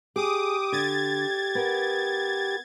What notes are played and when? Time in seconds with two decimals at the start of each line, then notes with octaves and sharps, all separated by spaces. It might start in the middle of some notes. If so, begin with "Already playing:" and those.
0.16 G4 G#4 D6 D#6
0.72 D3 G#6 A6
1.55 B3 A#4